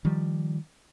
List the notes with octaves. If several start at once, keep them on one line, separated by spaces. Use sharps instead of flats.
D#3 F3 G3